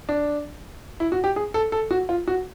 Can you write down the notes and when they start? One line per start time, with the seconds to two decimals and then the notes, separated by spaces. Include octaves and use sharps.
0.09 D4
1.00 E4
1.12 F#4
1.24 G4
1.36 G#4
1.54 A4
1.72 A4
1.91 F#4
2.09 F4
2.28 F#4